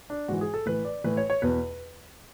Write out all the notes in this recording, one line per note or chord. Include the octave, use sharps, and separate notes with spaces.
D4
G#2 E3 F#4
G#4
A4
A2 E3 B4
D5
A2 E3 B4
C#5
C#5
E2 B2 B4